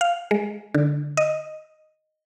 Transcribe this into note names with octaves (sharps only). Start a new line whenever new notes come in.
F5
G#3
D3
D#5